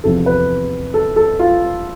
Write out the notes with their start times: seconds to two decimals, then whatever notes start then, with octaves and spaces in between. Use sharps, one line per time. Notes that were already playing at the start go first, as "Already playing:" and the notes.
0.04 E2 C3 F3 A4
0.26 B4
0.94 A4
1.16 A4
1.39 F4